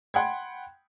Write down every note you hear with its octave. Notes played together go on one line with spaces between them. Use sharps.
F#5 G5 B5 C6 G#6